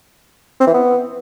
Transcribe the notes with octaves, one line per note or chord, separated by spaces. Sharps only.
C4
E3
B3